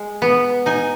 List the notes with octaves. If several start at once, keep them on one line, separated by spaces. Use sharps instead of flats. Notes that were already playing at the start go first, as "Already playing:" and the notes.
Already playing: G#3
B3
D#4 G#5